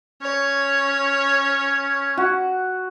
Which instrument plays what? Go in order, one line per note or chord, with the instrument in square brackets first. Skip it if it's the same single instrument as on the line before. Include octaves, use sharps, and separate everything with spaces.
[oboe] C#4 [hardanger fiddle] C#5
[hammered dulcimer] F#4